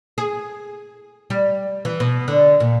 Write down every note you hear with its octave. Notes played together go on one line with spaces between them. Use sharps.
G#4
G3
E3
B2
D3
A#2